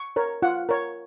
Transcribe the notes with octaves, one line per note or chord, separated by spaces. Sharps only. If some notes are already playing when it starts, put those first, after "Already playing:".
Already playing: C#6
A#4 C#5
F4 F#5
A#4 C#5